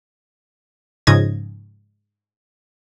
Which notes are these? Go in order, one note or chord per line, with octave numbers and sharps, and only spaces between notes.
G#2 C#3 F3 D#5 G#6 A#6